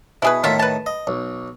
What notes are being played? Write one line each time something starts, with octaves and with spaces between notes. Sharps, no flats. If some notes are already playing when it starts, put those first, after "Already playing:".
B2 E4 G#4 B4
A2 D#3 F4 E5
B4 A5
D#5
B1